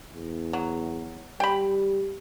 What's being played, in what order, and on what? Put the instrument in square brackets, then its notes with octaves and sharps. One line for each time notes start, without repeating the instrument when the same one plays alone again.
[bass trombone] E2
[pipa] F#3
[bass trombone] G3 [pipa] G5 B5